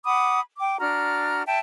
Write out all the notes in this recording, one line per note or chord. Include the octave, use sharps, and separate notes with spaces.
F#5 B5 D6 D#6
G5 D6
D4 F#4 A#5 F6
E5 G5 A5